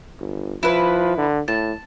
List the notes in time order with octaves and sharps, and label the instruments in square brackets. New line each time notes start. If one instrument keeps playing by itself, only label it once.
[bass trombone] G1
[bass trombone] F3 [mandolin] E4 B4
[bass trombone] D3
[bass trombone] A2 [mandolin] A5